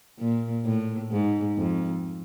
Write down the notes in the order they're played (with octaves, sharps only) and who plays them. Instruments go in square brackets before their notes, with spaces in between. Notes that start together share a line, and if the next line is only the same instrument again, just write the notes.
[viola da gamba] A#2
A2
G#2
F2